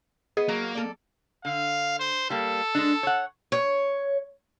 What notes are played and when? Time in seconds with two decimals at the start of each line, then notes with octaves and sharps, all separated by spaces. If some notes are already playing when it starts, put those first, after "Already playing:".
0.37 B3 G#4 D#5
0.48 F#3 A#3
0.75 A4 D5
1.45 D3 F5
1.99 C5
2.30 G3 A#3 A4
2.75 G#3 D4
3.03 C#5 F#5
3.52 C#5